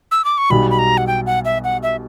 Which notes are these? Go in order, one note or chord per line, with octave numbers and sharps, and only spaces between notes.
E6
D6
C#6
B1 B2 G3 B5
B5
A#5
F#5
G5
F#5
E5
F#5
E5